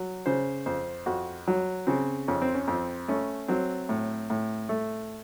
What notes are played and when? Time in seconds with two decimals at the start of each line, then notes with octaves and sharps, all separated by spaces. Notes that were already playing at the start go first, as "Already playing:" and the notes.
Already playing: F#3
0.26 C#3 C5
0.66 F2 C5
1.06 F2 F#4
1.47 F#3
1.87 C#3 C4
2.28 F2 C#4
2.42 C4
2.54 C#4
2.67 F2 C4
3.08 A3 C#4
3.48 F#3 C4
3.89 A2
4.30 A2
4.69 A3